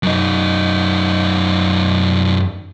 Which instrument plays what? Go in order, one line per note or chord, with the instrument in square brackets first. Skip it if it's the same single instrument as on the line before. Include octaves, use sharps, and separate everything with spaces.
[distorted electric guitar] F#2 D#4